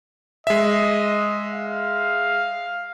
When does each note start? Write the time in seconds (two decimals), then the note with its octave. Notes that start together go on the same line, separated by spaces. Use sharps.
0.47 G#3 D#5 E5
1.54 F5